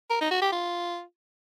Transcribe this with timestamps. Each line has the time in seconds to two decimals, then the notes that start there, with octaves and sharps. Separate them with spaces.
0.10 A#4
0.21 D#4
0.31 F#4
0.42 G4
0.52 F4